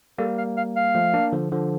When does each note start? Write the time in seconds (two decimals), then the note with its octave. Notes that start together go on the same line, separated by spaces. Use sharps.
0.18 G3 A#3 A4
0.37 F5
0.56 F5
0.76 F5
0.95 F3 A3
1.14 A#3 D4
1.33 D3 F3
1.52 D3 F3